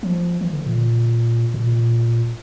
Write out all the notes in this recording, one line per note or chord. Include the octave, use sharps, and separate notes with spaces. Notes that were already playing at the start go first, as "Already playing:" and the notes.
F3
E3
D3
A#2
A#2